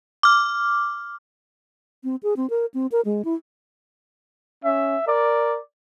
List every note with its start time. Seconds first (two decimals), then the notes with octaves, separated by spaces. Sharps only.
0.23 D6 F6
2.04 C4
2.23 G#4
2.37 C4
2.50 A#4
2.74 C4
2.92 A#4
3.05 G#3
3.25 E4
4.64 C#4 E5
5.08 A#4 D5